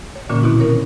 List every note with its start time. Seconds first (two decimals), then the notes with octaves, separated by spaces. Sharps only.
0.15 C#5
0.29 A#2 D3 E3 A#3 C#4 F#4
0.43 B2 D#3 C4 E4
0.60 C#4 D#4 A#4 C#5